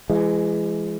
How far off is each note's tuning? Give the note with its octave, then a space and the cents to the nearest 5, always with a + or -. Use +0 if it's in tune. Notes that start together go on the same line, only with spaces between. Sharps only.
E3 +35 G#3 +0